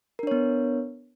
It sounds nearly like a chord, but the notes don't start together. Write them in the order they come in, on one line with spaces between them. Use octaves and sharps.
A#4 D4 C#5 B3